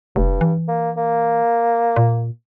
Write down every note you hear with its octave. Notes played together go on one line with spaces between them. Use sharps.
F1 G2
E3
A#3
A#3
A#2